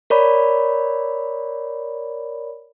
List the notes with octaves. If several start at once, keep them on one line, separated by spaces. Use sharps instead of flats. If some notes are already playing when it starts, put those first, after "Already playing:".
A#4 C#5 D5 B5